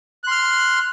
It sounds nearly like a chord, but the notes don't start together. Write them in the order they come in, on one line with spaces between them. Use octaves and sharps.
F#6 C6 F6